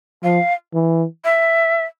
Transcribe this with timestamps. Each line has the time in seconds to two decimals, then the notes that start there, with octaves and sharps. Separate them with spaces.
0.23 F3 F5
0.74 E3
1.24 E5